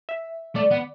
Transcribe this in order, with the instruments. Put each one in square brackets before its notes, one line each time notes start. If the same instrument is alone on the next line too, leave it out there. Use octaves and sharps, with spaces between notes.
[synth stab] E5
[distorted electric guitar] A3 [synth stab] D5
[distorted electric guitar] B3